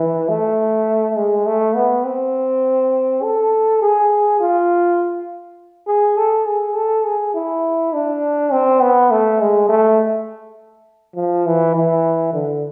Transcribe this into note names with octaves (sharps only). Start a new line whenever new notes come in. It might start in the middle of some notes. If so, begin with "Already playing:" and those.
Already playing: E3
A3
G#3
A3
B3
C4
A4
G#4
F4
G#4
A4
G#4
A4
G#4
E4
D4
C4
B3
A3
G#3
A3
F3
E3
E3
D3